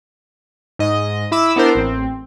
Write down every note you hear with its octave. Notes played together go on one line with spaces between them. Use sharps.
G#2 D#5
E4 B5 D6 E6
B3 D4 E4 A#4 C5
A1 C4